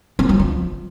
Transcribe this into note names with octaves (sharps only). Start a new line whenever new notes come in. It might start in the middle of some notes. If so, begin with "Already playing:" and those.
C4
F#3
F3